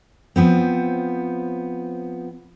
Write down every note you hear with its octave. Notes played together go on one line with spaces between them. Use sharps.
F3 B3 C4